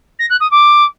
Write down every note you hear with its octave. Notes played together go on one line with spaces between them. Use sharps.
A#6
F#6
D#6
D6